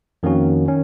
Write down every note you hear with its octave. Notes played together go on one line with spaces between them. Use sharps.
F2 D#3 A#3 C#4 F#4
D#3 C#4